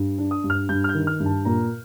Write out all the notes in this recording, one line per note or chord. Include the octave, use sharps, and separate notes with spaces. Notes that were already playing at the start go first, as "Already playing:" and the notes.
Already playing: G2
D4
D#6
G2
F6
G2 G6
F6
G6
D#3
F6
G2
A5
A#2 A#5